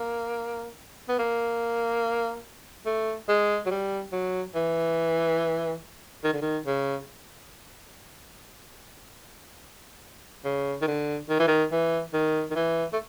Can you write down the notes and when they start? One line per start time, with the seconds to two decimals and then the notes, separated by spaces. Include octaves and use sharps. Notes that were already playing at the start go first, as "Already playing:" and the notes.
Already playing: A#3
1.09 B3
1.19 A#3
2.86 A3
3.29 G#3
3.66 F#3
3.71 G3
4.12 F#3
4.55 E3
6.24 D#3
6.33 D3
6.42 D#3
6.66 C#3
10.44 C#3
10.82 D#3
10.88 D3
11.29 D#3
11.39 E3
11.48 D#3
11.72 E3
12.14 D#3
12.51 D#3
12.55 E3
12.93 A3